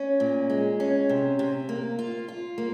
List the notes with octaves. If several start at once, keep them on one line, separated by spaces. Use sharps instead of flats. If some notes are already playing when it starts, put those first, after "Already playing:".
Already playing: C#4
A#2
G#3
C#4
C3
C3
A#3
F4
F4
A#3